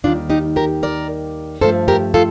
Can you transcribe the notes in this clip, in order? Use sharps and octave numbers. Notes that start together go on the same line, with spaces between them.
D#2 D#3 G3 D4 F4
D#4 G4
G4 A#4
A#4 D5
G2 F3 A3 A4 C5
G4 A#4
F4 A4